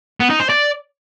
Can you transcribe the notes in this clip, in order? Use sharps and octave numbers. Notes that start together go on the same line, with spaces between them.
B3
D#4
C5
D5